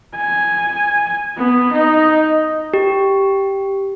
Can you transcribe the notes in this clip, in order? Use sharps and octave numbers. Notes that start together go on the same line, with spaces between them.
G#5
B3
D#4
G4